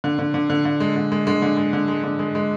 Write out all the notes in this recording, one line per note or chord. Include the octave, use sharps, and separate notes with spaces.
D3
D3
D3
D3
D3
G#3
D3
G#3
D3 G#3
D3
G#3
D3
G#3
D3
G#3
G#3